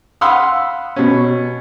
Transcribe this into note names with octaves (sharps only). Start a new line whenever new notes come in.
F5 F#5 B5 C6 D#6 E6
B2 C#4